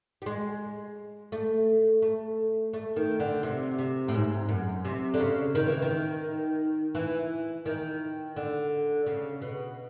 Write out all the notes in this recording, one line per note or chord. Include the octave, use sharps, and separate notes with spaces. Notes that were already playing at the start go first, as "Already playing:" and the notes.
G3
G#3
A3
A3
A3
D#3
D3
C3
C3
A2
G#2
F#2
C3
D3
C#3
D#3
E3
D#3
E3
D#3
D3
C#3
B2